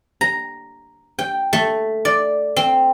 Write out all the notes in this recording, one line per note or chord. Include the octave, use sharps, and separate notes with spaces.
A#5
G5
A3
D5
C4